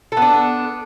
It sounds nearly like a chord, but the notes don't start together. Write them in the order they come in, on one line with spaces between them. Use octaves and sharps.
A4 B3 D4